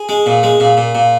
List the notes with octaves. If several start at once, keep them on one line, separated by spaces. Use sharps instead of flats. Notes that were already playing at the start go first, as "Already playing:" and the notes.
Already playing: G#4
G#3
A#2
G#3
A#2
A#2
A#2